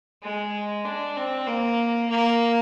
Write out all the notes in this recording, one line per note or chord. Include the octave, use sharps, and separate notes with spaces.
G#3
D4
C4
A#3
A#3